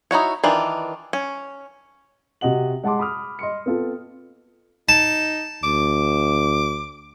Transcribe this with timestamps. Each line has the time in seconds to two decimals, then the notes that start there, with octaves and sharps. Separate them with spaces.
0.11 D#4 E4 F#4 C#5
0.44 D#3 E3 D4 F4
1.13 C#4
2.41 C3 F#4 D#5 F#5 F#7
2.84 G#3 F#5 A5 C6 D6
2.99 B5 D6 D#6 F6
3.39 D#5 C6 C#7
3.66 B3 C4 F4 A4
4.89 D#4 A5
5.64 D2 D6